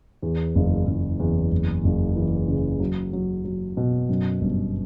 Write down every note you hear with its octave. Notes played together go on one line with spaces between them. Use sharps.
E2
F#1
F#1
E2
F#1
F#1
E3
C#3
F#3
F#3
F#3
B2
F#2
G1